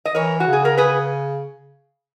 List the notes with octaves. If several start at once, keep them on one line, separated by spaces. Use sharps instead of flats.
D#5
E3 A#4 C#5
F#4
C#3
G#4
A#4
G#4 B4